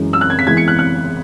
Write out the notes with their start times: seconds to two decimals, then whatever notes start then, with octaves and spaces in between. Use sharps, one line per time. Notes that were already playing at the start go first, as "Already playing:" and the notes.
Already playing: F#2 E3 G#3 C#4
0.13 E6
0.21 F#6
0.30 G#6
0.39 B6
0.46 E2 E3 G#3 E4 G#6
0.57 C#7
0.68 F#6
0.79 F#6